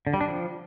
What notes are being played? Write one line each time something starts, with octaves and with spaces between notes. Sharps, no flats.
D3
G3
D4
F3